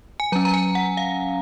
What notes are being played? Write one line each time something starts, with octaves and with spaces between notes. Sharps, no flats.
G#5
F#3 C#4 A#5
A#5
G#5
F#5
F5